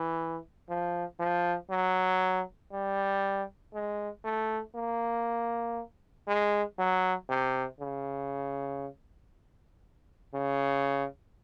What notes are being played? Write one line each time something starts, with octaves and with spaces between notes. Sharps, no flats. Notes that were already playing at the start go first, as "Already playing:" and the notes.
Already playing: E3
F3
F3
F#3
G3
G#3
A3
A#3
G#3
F#3
C3
C#3
C#3